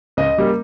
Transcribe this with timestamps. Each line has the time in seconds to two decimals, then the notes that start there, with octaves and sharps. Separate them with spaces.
0.17 C#2 D#5
0.37 C#3 G3 A#3